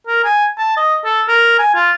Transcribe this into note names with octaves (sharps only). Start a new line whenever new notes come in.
A#4
G#5
A5
D#5
A4
A#4
G#5
F4